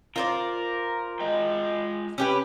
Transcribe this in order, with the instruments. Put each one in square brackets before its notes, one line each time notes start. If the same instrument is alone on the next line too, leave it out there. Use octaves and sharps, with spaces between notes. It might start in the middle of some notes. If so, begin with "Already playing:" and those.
[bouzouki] F4 C5 D5 [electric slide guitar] A#4
[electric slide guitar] G#3 D#5 G5
[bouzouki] C#4 G4 B4